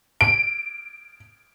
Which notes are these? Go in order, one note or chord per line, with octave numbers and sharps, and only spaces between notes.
D7